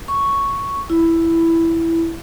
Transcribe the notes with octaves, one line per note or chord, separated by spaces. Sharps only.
C#6
E4